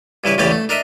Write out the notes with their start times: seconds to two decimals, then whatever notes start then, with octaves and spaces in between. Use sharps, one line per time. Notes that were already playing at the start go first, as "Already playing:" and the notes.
0.24 G2 C#3 E4 B4
0.38 A1 E2 C#3 E3 G4 D5
0.51 A3
0.69 D4 A#4 D#5 E5